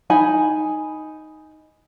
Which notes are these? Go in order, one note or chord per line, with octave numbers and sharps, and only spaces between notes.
D#4 G#5 B5